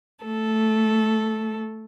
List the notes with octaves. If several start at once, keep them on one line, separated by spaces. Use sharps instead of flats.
A3 A4